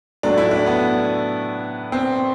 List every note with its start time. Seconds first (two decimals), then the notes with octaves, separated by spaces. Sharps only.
0.23 A2 F#3 A3 D4
0.38 E4
0.51 D4
0.66 B3
1.92 C4